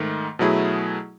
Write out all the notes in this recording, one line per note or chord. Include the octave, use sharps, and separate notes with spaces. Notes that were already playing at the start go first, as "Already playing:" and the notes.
Already playing: G#2 D#3 A3
B2 F#3 A3 E4 G#4